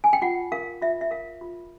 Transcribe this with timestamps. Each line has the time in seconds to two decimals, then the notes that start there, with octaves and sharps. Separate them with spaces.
0.04 G#5
0.13 G5
0.22 F4 F#5
0.52 A#4 F5
0.82 F4 E5
1.01 E5
1.11 A#4 F5
1.41 F4